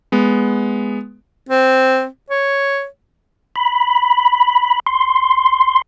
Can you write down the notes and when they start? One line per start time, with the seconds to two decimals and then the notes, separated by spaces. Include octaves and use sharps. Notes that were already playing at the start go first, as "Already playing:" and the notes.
0.12 G#3 B3
1.49 C4
2.30 C#5
3.56 B5
4.87 C6